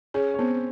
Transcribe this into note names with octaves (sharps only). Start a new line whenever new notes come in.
C#4 G#4 C#5
C#5
B3 C4 C5